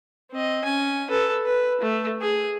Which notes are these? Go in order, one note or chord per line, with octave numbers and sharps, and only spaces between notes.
C4 D#5
C#4 G#5
A4 B4
B4
A3
G#4